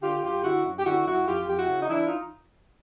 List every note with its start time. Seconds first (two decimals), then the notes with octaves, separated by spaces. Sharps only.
0.02 D3 F4 G4
0.22 F#2 F4 G4
0.43 D3 E4 F#4
0.65 F#2
0.79 G4
0.85 D3 E4 F#4
1.07 F#2 E4 F#4
1.27 F2 F4 G4
1.48 F2 G4
1.58 E4 F#4
1.69 C#3
1.82 D#4
1.89 E3 D4 E4
2.06 D#4 F4